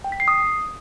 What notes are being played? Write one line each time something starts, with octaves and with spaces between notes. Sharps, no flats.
G5
B6
C7
D#6